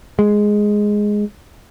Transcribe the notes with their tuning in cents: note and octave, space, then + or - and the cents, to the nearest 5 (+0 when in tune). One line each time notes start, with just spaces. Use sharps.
G#3 +0